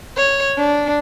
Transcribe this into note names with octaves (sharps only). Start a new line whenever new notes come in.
C#5
D4